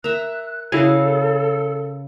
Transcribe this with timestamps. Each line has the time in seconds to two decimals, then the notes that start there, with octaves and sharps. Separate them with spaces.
0.04 A#4 E5 A#5 F#6
0.72 C#3 E4 F#4 G#4 A4 F5